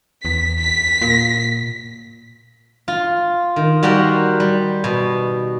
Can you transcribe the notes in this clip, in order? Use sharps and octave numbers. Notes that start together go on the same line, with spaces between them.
E2 B6
B6
A#2
F4
D#3
G3 F#4 G4 A#4 C5
G3
B2